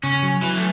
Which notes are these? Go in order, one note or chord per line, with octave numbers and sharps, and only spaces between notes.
C#3 C#4
F#3
E3 F#3
A3